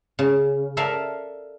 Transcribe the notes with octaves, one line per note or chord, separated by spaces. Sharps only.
C#3
A4 A#4 D5 E5 F5